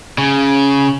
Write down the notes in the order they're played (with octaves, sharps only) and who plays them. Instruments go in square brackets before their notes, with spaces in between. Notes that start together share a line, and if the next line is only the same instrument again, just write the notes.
[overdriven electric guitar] C#3